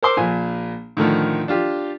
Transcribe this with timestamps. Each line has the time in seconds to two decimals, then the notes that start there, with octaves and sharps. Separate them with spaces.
0.03 A#4 C5 C6 D6 E6
0.17 A#1 A#2 G#5
0.97 A2 D3 D#3 F3
1.48 D4 F4 G4